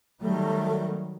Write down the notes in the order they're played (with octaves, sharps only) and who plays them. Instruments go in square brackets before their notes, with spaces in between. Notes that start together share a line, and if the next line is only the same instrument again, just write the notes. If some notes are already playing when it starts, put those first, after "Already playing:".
[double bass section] D#3 F#3 G3 [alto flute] A3